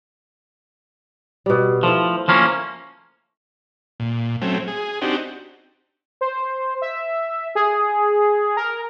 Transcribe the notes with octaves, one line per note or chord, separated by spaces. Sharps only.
B2 G3
F3 A3 E4
F3 A#3 C#4
A#2
F#3 A3 C4 C#4
G#4
C4 D4 D#4 F#4 G4
C5
E5
G#4
A#4